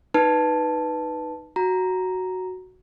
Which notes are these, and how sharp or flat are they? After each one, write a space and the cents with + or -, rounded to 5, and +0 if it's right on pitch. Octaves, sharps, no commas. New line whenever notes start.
D#4 +0 B4 +0 A5 +0
F#4 +0 A#5 +0